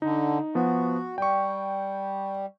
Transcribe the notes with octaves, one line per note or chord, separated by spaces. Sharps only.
D3 D#4
F3 B3 F#4
G3 G5 C#6